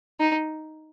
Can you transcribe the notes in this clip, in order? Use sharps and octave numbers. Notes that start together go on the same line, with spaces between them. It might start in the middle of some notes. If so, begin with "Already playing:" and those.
D#4